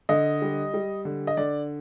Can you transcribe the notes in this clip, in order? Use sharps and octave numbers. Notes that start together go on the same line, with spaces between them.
D3 D#5
G3
G3
D3
D#5
D3 D5